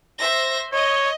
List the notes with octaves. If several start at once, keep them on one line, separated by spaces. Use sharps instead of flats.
C5 E5 A#6
C#5 D#5